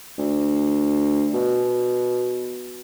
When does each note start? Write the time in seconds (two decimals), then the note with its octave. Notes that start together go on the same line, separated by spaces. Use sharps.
0.18 D2
1.34 B2